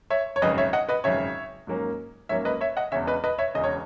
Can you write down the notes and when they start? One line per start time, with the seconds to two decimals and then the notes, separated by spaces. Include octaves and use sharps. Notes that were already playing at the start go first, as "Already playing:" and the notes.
0.10 C#5 E5
0.36 C#5
0.42 G#1 F#2 C#3 B4 D#5
0.58 C#5 E5
0.73 D#5 F#5
0.89 B4 D#5
1.04 G#1 F#2 C#3 C#5 E5
1.67 G#2 F#3 A#3 C#4
2.29 G#2 F#3 A#3 C#4 C#5 E5
2.45 B4 D#5
2.61 C#5 E5
2.77 D#5 F#5
2.92 E1 E2 C#3 C#5 E5
3.07 B4 D#5
3.24 B4 D#5
3.39 C#5 E5
3.54 E1 E2 C#3 D#5
3.64 C#5